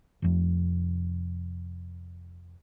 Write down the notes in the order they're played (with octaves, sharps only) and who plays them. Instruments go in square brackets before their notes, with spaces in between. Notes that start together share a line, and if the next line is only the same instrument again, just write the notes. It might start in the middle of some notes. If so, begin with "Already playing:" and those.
[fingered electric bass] F1 F2